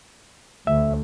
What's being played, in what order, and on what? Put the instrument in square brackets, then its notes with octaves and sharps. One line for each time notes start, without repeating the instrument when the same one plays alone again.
[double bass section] D2 [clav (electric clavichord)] E5